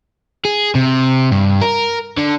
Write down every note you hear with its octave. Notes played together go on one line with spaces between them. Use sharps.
G#4
C3
G2
A#4
D3